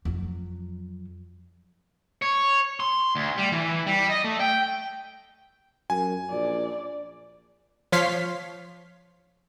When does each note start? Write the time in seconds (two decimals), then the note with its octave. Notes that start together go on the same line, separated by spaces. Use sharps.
0.05 F2 F#3
2.22 C#5
2.80 C6
3.15 D2
3.38 G3
3.52 E3
3.87 G3
4.10 D#5
4.24 A3
4.40 G5
5.90 F#2 G#5
6.31 A#1 D5
7.92 F3 C#5 F5 C6 B6